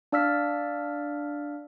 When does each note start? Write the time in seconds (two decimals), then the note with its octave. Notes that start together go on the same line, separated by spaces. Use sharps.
0.12 D4 D5 F5 E6 F6 B6